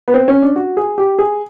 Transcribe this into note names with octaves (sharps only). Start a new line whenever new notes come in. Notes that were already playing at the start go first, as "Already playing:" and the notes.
B3
C4
C#4
D4
F#4
G#4
G4
G#4